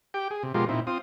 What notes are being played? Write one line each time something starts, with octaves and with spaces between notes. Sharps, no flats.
G4 G5
G#4
C3
B2 F3 G#3 F4 G4 A#4
A#2 C4 D#4 E4
C4 F4 D#6